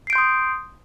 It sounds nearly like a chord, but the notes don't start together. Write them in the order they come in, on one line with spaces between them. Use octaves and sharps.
C7 D7 G6 C6 D#6